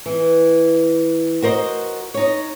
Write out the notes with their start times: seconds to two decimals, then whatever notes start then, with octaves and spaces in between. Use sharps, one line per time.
0.06 E3
1.42 F#4 A#4 C5 D#5
2.14 D#4 C#5